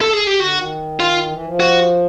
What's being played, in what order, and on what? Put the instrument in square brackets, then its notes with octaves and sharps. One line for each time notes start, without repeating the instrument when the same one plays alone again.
[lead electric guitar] A4
G#4
G4
[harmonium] D3 [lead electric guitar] F#4
[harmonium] D#3
[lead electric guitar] F4
[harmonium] E3
F3
[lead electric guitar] F#4